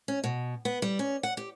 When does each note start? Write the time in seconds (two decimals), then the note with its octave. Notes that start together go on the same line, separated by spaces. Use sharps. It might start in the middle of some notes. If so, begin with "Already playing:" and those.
0.08 C#4
0.24 B2
0.65 B3
0.82 G3
0.99 C#4
1.23 F#5
1.37 G4